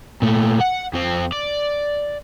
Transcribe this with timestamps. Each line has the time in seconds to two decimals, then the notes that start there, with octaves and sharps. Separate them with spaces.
0.22 A#2 A3
0.61 F#5
0.94 F2 C4
1.32 D5